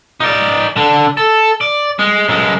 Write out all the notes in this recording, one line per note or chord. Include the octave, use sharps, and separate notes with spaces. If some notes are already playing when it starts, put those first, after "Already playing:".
D#4 D5
D3 D4
A4
D5
G#3
F#2 G#3